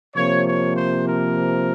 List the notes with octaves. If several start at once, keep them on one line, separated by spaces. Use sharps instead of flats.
C3 F3 A#3 C#5
C#5
C5
A#4